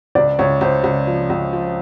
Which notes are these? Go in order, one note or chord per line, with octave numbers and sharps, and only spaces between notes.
C#2 D5
C#2 C#5
C#2 C5
C#2
F3
C#2
F3